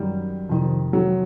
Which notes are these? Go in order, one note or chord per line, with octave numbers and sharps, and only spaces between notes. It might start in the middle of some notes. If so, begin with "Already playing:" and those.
Already playing: F#2 D#3 G3
F2 C3 D#3
F#3